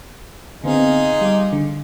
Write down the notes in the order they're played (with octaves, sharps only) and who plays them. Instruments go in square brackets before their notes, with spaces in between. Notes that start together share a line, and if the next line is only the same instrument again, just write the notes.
[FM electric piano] D3 B3 C4 [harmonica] D#4 F4 G#4
[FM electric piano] G3 D6
D3